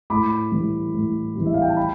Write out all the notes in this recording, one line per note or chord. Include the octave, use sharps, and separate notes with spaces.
A2 B5 D6
E3 G3
A2
E3 G3
E5
F5
G5
A5
G5 B5